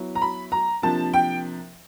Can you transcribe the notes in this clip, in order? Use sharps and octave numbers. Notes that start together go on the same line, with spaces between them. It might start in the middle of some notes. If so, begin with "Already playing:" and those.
Already playing: F#3 B3 E4
A#5
B5
A#5
C3 F3 A#3 D4 A5
G5